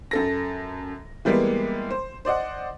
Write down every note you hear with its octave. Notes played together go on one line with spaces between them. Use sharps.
F#2 A4 A#6
E3 G3 G#3 A#3 B3
C5
C5 D5 D#5 F#5